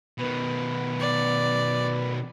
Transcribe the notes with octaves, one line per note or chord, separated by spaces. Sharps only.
B2 D#3 B4
D5